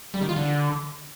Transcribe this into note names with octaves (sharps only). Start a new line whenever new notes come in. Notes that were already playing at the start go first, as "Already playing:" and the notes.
G3
D#3
F4
D3